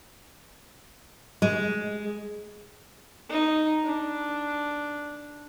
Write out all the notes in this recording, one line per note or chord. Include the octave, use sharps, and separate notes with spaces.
G#3
D#4
D4